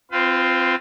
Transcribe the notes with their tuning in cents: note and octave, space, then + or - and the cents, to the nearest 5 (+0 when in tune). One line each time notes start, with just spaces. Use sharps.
C4 +0 F4 +0 B4 +40